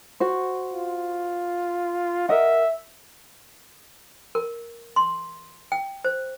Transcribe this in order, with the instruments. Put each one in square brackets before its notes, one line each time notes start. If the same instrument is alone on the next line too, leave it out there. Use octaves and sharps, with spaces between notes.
[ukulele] F#4 C5
[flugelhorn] F4
[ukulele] A#4 D#5 F#5 [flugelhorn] E5
[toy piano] A#4
C6
G5
C5